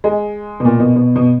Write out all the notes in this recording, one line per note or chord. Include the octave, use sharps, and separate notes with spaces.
G#3
B2
A#2
B2
B2
B2